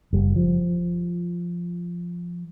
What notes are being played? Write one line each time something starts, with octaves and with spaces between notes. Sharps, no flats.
F#1 G3
F3